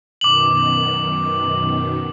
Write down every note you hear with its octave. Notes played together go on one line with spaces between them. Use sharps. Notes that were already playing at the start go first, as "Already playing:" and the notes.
F#2 B2 D#3 D6 F#7